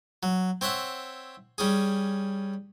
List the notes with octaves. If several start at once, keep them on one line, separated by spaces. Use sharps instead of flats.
F#3
C4 C#5 E5 F#5
G3 C#4 G#4